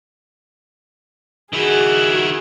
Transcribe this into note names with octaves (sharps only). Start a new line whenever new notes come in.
D#3 E4 F#4 G#4